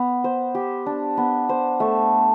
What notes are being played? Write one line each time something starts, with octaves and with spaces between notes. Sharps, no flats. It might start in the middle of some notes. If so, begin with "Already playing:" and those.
Already playing: B3
C5
G4
D4
B3
C5
A3